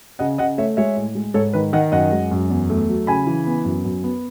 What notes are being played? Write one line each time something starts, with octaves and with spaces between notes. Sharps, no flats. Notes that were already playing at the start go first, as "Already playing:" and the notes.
C#3 D#5 F#5
C#3 D#5 F#5
A3 C#5 E5
G#3 C#5 E5
A2
G#3
G#2 A4 C#5
D#3 B4
D#3 D#5 F#5
F#2 D#5 F#5
G#3
F#2
E2
A3
F#3
C#3 G#5 B5
E3
B3
F#2
F#2
B3